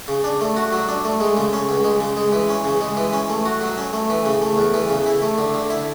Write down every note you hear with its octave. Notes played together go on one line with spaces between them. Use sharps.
C#3
D4
A3
F#4
F#3
D4
A3
G#3
C#3
C#4
C#2
G#3
C#3
G#3
E3
C#4
C#3
G#3
E3
C#4
A3
F#4
F#3
C#4
A3
E3
C#3
A3
E2
E3
C#3
E4
A3
D3
D3
E4